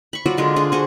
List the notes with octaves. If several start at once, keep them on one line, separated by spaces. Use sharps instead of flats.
B5 C#6
F#3 F4 F#4 D5
D3 G#3 F4 A#4
D4 F4 G#4
F#4 G#4 C5